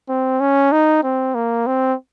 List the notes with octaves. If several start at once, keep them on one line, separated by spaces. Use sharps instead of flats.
C4
C#4
D#4
C4
A#3
C4